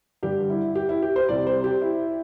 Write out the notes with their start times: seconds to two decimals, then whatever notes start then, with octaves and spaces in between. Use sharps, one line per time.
0.23 G2 D3 G3 G4
0.50 E4
0.75 G4
0.89 E4
1.02 G4
1.16 C5
1.29 C2 C3 G3 D5
1.47 C5
1.64 G4
1.82 E4